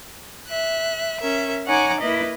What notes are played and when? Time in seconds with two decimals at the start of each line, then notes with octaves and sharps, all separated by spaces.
0.47 E5 F#6
1.20 C#4 A#4 E5
1.65 D#4 C#5 F#5 G#5 A#5 D6
2.00 A#3 E4 B4 D#5